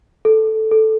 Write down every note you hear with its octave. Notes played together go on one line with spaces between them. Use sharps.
A4
A4